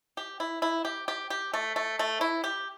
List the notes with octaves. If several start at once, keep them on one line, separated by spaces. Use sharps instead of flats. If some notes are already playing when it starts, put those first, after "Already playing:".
G4
E4
E4
G4
G4
G4
A3
A3
A3
E4
G4